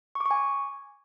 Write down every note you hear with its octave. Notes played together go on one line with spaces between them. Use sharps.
C#6
D6
C#6
G#5